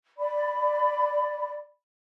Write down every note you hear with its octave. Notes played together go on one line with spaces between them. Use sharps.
D5 B5